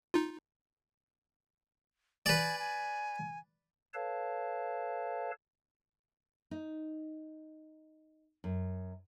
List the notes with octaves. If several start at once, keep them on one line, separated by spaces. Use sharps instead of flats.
D#4 F4
B4 D5 G#5
G#5
A4 B4 C#5 F5 A5
D#4
F#2